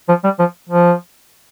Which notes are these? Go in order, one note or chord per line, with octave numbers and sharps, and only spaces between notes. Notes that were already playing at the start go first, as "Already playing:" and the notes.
F3
G3
F3
F3